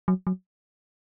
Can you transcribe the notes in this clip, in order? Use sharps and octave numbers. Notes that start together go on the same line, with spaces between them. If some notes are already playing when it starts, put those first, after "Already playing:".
F#3
F#3